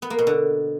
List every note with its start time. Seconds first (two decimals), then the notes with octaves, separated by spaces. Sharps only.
0.02 B3
0.10 A#3
0.19 B2
0.27 D3